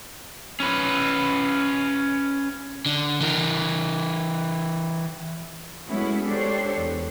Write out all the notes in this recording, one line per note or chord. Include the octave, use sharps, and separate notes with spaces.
C#4 B4
D3
E3 A#4
G#3 A3 B3 C#4 E4 F#4
D4 G4 A4 C5 C#5
E2